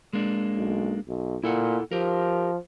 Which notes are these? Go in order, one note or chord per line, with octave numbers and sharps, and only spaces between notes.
G#3 A#3 D4
B1
B1
A#2 E4 A4 F#5
F3 G4 A#4